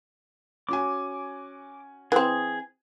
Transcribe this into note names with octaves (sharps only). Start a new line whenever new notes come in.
C#4 F#4 G#5 D6
E3 C4 G#4